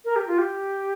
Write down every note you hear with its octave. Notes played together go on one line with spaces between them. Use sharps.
A#4
G4
F4
G4